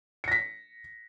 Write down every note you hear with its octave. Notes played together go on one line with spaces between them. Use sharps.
A#6 B6 C#7